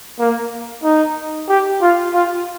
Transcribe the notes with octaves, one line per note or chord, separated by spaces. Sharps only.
A#3
D#4
G4
F4
F4